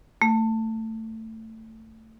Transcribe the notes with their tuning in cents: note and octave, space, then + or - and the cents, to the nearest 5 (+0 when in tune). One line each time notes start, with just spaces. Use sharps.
A3 +20